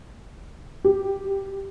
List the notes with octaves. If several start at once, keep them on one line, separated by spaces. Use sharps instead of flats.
G4